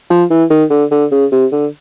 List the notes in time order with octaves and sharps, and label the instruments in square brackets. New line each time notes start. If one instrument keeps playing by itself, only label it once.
[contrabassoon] F3
E3
D#3
D3
D3
C#3
C3
D3